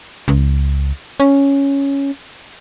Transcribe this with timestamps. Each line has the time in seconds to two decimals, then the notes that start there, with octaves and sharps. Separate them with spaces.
0.28 C#2
1.20 C#4